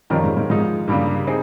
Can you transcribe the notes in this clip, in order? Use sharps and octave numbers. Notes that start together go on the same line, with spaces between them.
F2 D#3 G3 C#4 F4 A#4
G#2
G#2
G#2 F3 G#3 D#4
G2 C#3 G3 A#3
C4 D#4 G#4